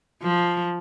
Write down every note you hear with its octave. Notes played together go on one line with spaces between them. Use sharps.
F3